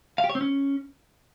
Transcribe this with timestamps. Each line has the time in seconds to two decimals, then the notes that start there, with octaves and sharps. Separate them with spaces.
0.18 F5
0.24 G4
0.29 C#5
0.35 C4
0.41 C#4